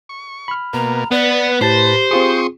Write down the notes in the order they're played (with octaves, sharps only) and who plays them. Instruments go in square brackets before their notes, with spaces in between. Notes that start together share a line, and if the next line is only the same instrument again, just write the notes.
[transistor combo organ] C#6
[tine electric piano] B5 F6
[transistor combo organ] B2 A#3 [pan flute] A#5
[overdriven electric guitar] B3 [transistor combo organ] B4 [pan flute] D5
[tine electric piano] A2 A5 A6 [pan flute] G4 [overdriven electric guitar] C5
[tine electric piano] C4 F4 G#4 [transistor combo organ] C6 C#6 D#6